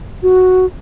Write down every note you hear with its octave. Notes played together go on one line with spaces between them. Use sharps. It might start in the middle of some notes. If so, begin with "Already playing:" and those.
F#4